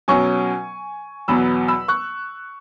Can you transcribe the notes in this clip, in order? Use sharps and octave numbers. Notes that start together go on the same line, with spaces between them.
B2 F#3 C#4 G#5 C#6
E2 B2 F#3 B3 B5 E6
B5 E6
C#6 F#6